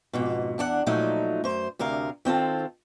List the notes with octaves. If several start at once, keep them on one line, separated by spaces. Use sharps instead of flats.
F2 G#2 B2
E2 D4 F#4 F#5
A#2 F3 F#3 A3 D#4
F#2 C5
D2 C3 A#4 F5
D#3 C4 F4 A4